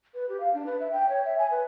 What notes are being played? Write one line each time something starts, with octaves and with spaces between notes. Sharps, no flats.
B4
G4
F5
D4
B4
E5
G5
C#5
E5
G#5
B4